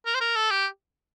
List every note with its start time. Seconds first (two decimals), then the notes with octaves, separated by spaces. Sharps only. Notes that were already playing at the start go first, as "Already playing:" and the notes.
0.06 A#4
0.15 C5
0.21 A#4
0.36 A4
0.51 G4